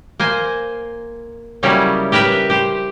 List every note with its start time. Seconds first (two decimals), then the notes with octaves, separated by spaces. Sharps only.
0.20 A#3 C5 G#5
1.63 C#3 F#3 G3 A#3 C#4 E4
2.12 G4 A#4 B4 E5
2.50 G4 C5